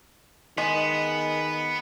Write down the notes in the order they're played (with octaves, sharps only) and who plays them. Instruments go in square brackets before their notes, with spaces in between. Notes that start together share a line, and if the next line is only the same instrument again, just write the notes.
[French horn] D#3 [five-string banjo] G#3 [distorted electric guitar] B3